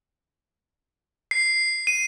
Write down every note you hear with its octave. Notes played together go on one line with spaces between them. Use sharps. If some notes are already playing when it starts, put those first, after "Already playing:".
C7
D#7